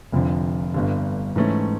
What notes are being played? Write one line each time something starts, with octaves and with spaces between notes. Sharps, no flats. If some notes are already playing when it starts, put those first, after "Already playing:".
F1 F2 D3 F3
G1 G2 D3
G#2 E3 A3 C#4